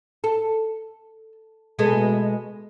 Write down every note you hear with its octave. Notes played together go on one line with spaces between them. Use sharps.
A4
B2 G#3 A3